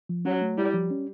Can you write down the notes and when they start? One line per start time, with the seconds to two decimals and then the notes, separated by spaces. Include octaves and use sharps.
0.09 F3
0.25 F#3 C#4
0.41 A3
0.58 G3 E4
0.74 F3
0.91 C#4